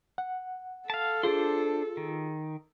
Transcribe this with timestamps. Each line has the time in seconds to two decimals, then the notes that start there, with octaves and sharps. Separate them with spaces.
0.18 F#5
0.90 A4 F5 A5
1.23 D4 F4 G#4 C5 C6
1.97 D#3